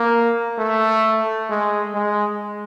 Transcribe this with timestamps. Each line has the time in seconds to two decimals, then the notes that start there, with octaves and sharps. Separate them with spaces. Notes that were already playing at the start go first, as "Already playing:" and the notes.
Already playing: A#3
0.58 A3
1.50 G#3
1.94 G#3